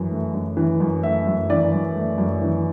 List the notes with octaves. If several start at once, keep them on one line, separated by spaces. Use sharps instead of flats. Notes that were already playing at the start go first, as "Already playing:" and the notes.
Already playing: F#2 E3
A3
F#2
E3
F#2
A3 E5
F#2
E3 D5
F#2
A3
F#2
E3